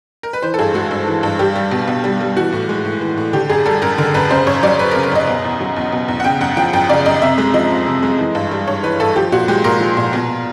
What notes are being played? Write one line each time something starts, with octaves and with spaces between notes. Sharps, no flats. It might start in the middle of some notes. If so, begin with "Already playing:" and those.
A#4
B4
E3 C5
A4
G2 G#4
G#3 F#4
G2
E3
G2
G3 G4
G3
B2
B2
G3
G3
E3 F#4
A2
G#3
A2
E3
A2
D3 G4
F#2 G#4
G3 A4
F#2 A#4
D3 A#4
F#2 B4
C#3 C5
F#2 C#5
F#3 D5
F#2 B4
A#4
C#3
A#4
F#2 D#5
B2
E2
F#3
E2
B2
E2
F#5
C#3 G5
F#2 F#5
F3 G5
F#2 G5
C#3 D5
F#2 D#5
C3 E5
G#3
F3 D#5
F2
C3
G#3
E3
G2
G3
G2 C#5
E3 B4
G2 A4
F3 G4
A#2 F#4
G#3 G4
A#2 A#4
F3
A#2
B2